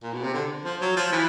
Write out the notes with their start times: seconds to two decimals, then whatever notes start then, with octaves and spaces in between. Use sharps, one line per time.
0.03 A#2
0.13 B2
0.24 C3
0.34 D3
0.65 F3
0.81 F#3
0.97 F3
1.12 E3